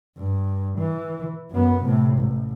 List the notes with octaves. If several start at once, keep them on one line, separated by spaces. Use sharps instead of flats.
G2
E3
F#2 B3
A2 C3
A1